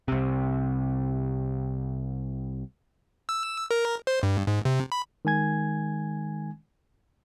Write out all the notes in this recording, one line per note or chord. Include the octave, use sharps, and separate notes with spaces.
C2 C3
E6
A#4
C5
G2
G#2
C3
B5
D#3 G#3 G#5 G#6